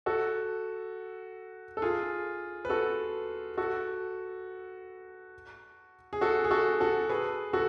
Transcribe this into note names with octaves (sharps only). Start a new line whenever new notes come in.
F#4 A4
A4
F4 G#4
B4
F#4 A4
F#4 A4
G#4
F#4 A4
G#4
F#4 A4
F#4 A4
G#4 B4
F#4 A4